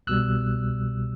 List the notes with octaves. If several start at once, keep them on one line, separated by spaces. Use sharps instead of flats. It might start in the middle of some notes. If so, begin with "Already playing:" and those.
C2 B2 G3 E6 F#6